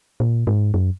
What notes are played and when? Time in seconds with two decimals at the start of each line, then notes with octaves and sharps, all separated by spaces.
0.20 A#2
0.47 G#2
0.74 F#2